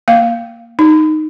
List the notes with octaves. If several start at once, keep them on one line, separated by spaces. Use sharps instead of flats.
A#3 F5
D#4